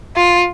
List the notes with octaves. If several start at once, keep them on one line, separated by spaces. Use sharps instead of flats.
F4